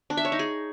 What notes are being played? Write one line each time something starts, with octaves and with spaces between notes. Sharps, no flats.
D4
E5
C#5
D#4
G#4